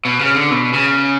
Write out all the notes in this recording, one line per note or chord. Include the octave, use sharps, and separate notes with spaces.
B2
C#3
D3
B2
C#3